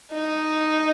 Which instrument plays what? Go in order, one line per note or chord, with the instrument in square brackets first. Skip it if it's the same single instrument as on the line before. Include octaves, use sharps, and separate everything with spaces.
[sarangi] D#4